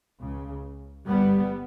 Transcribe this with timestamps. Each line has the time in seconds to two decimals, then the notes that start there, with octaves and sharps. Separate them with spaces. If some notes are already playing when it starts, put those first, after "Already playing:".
0.21 C#2 C#3
1.06 G1 G2 G3 B3